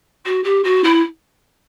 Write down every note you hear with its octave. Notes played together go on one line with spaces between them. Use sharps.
F#4
G4
F#4
E4